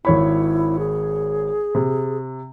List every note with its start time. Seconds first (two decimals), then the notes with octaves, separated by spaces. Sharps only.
0.05 G#1 E4 C#5 B5
0.79 G#4
1.75 C3